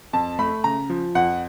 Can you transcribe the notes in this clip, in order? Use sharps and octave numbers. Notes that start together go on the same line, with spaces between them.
F2 A5
A3 B5
C#3 A#5
F3
F2 F#5